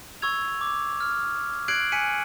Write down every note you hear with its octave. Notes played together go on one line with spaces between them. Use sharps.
C#6 E6 G#6 F7
D6
F6
F#6 G#6 C7 D7 F#7
G#5 F#6 B6 C#7 D#7